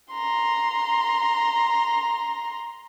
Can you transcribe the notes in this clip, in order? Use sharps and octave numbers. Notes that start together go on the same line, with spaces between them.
A#5 C6